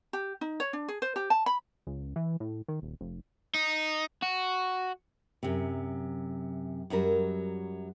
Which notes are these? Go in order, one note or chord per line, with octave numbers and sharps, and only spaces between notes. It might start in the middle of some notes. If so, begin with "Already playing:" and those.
G4
D#4
C#5
D4
G#4
C5
G4
A5
B5
C#2
E3
A2
D#3
D#1
F1
D#4
F#4
F#2 C3
F#2 F#3 G3 A#4